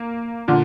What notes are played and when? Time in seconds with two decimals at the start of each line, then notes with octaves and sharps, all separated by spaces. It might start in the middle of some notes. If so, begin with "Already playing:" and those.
Already playing: A#3
0.48 A#2 D3